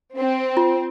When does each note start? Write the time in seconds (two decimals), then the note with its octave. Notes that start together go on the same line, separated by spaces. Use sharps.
0.16 C4
0.57 F4